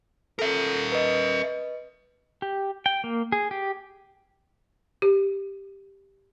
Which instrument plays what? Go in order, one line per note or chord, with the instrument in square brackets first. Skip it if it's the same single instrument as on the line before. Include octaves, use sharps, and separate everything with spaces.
[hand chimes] A4 [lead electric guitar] A#4 E5
[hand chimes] B4 D#5
[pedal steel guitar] G4
G5
A#3
G#4
G4
[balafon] G4